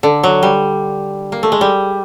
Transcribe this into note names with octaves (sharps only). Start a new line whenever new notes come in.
D3
F#3
G3
A#3
A3
G#3
G3